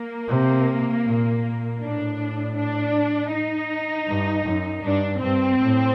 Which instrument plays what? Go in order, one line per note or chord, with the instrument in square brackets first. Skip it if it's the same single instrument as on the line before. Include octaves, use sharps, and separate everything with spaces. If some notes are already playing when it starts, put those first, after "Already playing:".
Already playing: [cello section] A#3
[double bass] C3
A#2
[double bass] A2 [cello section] D4
[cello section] D4
D#4
[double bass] G2
F#2
[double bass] G2 [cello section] D4
[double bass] G2 [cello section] C4
[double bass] A2